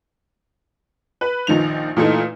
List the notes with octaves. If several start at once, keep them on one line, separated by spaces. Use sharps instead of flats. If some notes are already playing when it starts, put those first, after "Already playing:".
B4
A#1 D#3 F3 F7
A#2 E3 A3 D#4